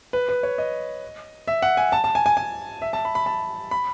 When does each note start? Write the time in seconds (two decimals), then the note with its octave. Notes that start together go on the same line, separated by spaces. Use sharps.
0.13 B4
0.29 B4
0.43 C#5
0.58 D#5
1.48 E5
1.62 F#5
1.77 G#5
1.92 A5
2.04 A5
2.15 G#5
2.26 G#5
2.37 G#5
2.82 E5
2.93 A5
3.05 B5
3.15 B5
3.26 A5
3.71 B5